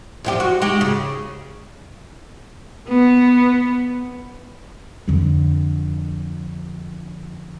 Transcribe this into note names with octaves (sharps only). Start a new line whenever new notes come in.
E2 F3 G4
F#4
G#3 D#4 G4
C#3
B3
F2 D3